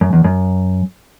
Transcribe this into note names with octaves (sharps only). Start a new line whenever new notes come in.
F#2
E2
F#2